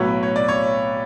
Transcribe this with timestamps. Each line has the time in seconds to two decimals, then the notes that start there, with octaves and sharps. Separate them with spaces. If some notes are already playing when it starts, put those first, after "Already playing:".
Already playing: B1 A2 F#3 B3 C#5
0.23 C#5
0.36 D5
0.48 C#5